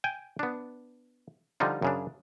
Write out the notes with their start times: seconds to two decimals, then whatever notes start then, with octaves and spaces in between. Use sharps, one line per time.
0.04 G5 G#5
0.39 B3 D4
1.60 D3 F3 G3 D#4 F4
1.82 F#2 C#3 D4